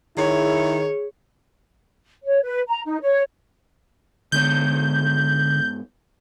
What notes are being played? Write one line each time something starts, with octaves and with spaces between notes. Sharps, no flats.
D#3 E4 G#4 C#5
C#5
B4
A#5
D#4
C#5
G#2 D3 B3 C#5 G6